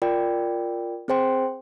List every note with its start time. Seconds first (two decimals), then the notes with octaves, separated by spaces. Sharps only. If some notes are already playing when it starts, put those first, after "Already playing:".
0.02 F4 A#4 D5 G5
1.08 C4 G#4 C5 G5 C6